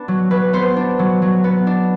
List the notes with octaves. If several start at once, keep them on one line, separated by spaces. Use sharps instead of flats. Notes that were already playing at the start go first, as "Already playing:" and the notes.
Already playing: B3 D4
F#3
F#3 B4
B3 C5
D4
F#3
F#3
B3
D4